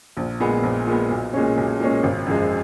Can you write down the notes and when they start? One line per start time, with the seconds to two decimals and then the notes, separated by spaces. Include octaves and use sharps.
0.17 A#1
0.40 A#2 G#3 B3
0.63 A#1
0.87 A#2 G#3 B3
1.10 B1
1.33 A#2 G#3 C#4
1.57 B1
1.80 A#2 G#3 C#4
2.03 G#1
2.26 F#2 F3 G#3